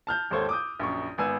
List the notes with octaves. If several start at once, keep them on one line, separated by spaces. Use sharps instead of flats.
A5 F6 G6
G#1 D#2 A4 C5 C#5
D6 D#6 G6
A#1 F#2 C#6
G#1 B3 G#5 E6